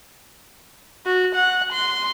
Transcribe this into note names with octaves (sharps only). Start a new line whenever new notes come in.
F#4
F#5
C6